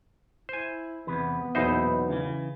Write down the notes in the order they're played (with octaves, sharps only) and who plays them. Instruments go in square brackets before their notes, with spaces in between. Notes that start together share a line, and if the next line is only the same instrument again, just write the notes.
[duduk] E4 [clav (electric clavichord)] C5 G#5
[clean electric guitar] E2 C3 B4 [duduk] B3
[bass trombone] B1 [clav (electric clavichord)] E2 D#4 C5 [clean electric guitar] A#2 E4
[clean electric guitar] C#3 E3